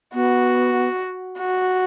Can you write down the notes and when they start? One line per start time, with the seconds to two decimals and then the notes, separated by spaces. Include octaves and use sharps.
0.14 B3 F#4
1.39 F#4